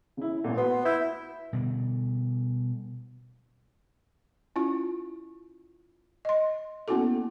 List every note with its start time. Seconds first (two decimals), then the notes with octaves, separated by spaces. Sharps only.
0.17 C#3 E4
0.44 A1 A#2
0.57 B3 F#4 C6
0.85 E4 E6 G6
1.53 B2 D3 G3
4.56 C#4 E4 F4
6.25 D#5 C6
6.88 A#3 B3 C#4 E4 F#4 A4